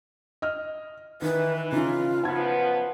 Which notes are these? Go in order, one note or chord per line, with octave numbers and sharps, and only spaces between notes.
D#5 F6
D#3 E3 B4
C#3 D#4 F4
F#2 F3 B3 A5 G#6